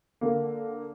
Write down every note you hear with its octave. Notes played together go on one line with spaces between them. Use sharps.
D3 A#3